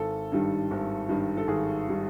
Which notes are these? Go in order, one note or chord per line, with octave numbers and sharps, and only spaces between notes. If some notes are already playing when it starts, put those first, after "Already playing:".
Already playing: G#1 A4
G2 D#3 G3
G#1
G2 D#3 G3
A4
G#1 G#4
D#3 G3